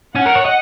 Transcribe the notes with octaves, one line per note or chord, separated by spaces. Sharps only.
C#4 F#5
A#4
C#5
D#5